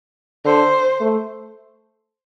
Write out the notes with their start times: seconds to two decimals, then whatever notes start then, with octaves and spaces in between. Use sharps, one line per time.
0.45 D3 C5
1.01 A3